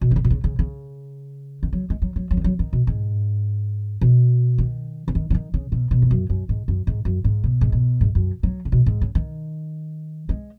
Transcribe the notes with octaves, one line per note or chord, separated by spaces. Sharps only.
B2
D#3
C#3
B2
C#3
C#3
C#3
D#3
F#3
G#3
F#3
F#3
F#3
D#3
F#3
D#3
B2
G#2
B2
D#3
C#3
D#3
C#3
D#3
C#3
B2
B2
G#2
F#2
F#2
G#2
F#2
G#2
F#2
G#2
B2
G#2
B2
G#2
F#2
F#3
C#3
B2
G#2
C#3
D#3
G#3